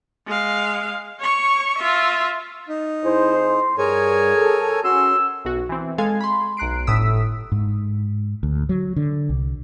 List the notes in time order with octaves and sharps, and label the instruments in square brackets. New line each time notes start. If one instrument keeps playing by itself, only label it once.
[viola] G#3 F5
C#5 C#6
F4 E5
[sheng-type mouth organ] D#4
[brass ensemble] F2 G#4 C5 [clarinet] E4
[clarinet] C6
[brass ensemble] G2 [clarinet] G#4 [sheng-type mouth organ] A#4 C#5 G#5
[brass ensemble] A4
[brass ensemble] C#4 [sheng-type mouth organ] F#4 C6 [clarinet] E6
[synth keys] B1 F#4
E3 C4
G#3 A4 F5 G#5 G#6
B5 C6
B1 A#5 F#6 C7 D7
G1 A2 D#6 E6 B6
[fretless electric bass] G#2
D2
F#3
D3
C2